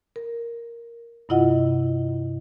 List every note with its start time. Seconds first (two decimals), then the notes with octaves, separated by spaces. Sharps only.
0.16 A#4
1.29 G2 C3 E4 F4 D#5 F#5